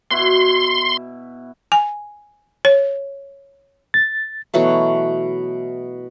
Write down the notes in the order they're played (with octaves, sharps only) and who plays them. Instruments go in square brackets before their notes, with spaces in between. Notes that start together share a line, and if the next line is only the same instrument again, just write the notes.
[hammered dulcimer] B2 E4 [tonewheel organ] C6
[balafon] G#5
C#5
[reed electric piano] A6
[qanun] B2 E3 F#3 A3